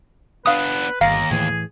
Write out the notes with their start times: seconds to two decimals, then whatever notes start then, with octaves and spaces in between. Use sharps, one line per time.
0.46 B3 D4 B4 F5 D#6
1.01 G1 D#2 F5 A#5
1.31 A2 E3 G#4